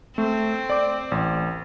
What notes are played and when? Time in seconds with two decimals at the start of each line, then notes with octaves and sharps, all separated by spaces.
0.18 A3 C4
0.70 D5 D6
1.11 A1